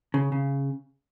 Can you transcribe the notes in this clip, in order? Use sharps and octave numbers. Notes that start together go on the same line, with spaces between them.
C#3
C#3